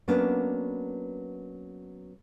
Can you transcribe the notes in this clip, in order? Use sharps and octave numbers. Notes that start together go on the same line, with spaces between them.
F#3 A#3 B3 C#4 D4